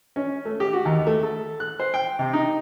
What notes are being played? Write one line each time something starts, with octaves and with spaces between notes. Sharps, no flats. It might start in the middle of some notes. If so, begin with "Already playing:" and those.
C#4
A3
G4
F#4
D#2
A3
A4
F#6
C5
G5
C3
D#4